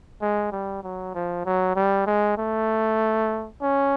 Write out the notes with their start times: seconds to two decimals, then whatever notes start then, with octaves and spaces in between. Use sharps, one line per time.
0.21 G#3
0.52 G3
0.83 F#3
1.14 F3
1.45 F#3
1.76 G3
2.06 G#3
2.38 A3
3.62 C#4